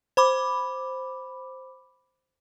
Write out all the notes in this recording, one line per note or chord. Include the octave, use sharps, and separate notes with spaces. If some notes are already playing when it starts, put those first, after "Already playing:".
C5 B5 D6